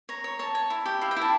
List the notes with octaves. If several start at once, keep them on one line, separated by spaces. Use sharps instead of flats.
C#5 A#5
C#5
C#5 A5
C#5
E4
G4
E4 F5
G5
E4
A5